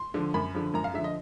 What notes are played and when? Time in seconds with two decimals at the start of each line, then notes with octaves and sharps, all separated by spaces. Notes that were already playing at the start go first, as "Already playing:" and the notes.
Already playing: C6
0.14 D3 F3
0.34 F#2 B5
0.55 D3 F3
0.74 F#2 A#5
0.84 F5
0.94 D3 F3 E5
1.04 D#5